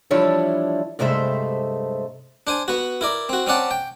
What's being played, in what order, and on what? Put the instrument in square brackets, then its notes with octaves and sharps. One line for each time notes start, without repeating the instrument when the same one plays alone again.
[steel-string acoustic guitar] E3 F3 G3 D4 E4 C#5
G2 C3 G#3 A3 C5 E5
[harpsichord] D4 C5 G#5
B3 F#4
E4 A#4 D5
C4 F#4
C4 C#4 D5 F#5 A5
G5